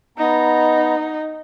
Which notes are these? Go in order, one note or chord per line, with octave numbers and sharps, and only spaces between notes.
B3 D#4 A#5